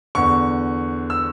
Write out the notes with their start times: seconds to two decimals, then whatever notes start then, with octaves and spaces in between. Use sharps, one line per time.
0.15 E2 D3 C#6
1.10 E6